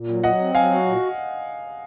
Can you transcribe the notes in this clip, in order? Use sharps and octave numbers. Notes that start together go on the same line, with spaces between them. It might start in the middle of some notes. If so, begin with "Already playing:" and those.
Already playing: A#2
F#3
F#3 D#5 F#5
C4
F#3 F5 G#5
F#4
A#2